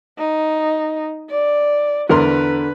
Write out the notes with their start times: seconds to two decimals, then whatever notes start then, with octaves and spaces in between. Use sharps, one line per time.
0.18 D#4
1.30 D5
2.10 E2 D3 A#4 B4 C6